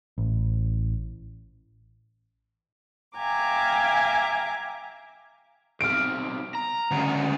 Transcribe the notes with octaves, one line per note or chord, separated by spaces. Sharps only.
A1
E5 F5 G5 G#5 A#5 D6
B1 C3 F6 D7
A#5
D2 C#3